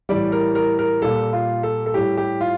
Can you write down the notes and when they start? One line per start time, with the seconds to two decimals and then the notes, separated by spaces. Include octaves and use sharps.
0.09 A2 E3 G3 D5
0.32 A#4
0.55 A#4
0.79 A#4
1.02 A#2 G3 A4
1.33 F4
1.63 A4
1.86 A4
1.94 A2 G3 G4
2.17 G4
2.41 F4